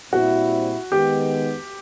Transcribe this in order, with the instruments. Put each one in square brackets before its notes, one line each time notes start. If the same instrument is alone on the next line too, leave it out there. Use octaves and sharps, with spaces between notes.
[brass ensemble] A#2 G3 C4 E4 [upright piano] F#4
[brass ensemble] D#3 G#3 B3 [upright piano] G4